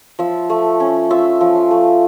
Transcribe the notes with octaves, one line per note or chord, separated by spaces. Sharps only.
F3 E5
A3
C#4
F4 E5
F3
F5
A3